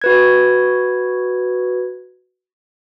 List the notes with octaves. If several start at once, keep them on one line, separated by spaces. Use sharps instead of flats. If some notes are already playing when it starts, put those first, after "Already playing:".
F#4 B4 G#6